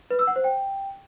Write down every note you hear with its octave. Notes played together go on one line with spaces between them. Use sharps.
B4
E6
F#5
C5
G5